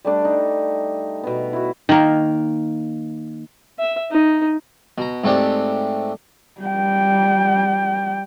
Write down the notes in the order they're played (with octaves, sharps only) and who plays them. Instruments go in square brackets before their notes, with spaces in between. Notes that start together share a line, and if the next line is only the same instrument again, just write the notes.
[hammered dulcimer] G3 A3 D4
D#4
B2 B3
E4 F#4
[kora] D#3 A#3
[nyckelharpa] E5
D#4
[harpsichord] B2 A#5
G#2 A3 C4 D4 G4
[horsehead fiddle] G3 G5